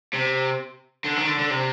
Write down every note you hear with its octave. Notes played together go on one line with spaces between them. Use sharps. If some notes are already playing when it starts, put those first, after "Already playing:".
C3
D3
D#3
D3
D3
C3